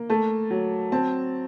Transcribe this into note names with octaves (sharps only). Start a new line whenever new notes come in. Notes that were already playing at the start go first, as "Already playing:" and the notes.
Already playing: A#3
A3 A5
F#3
C4 A5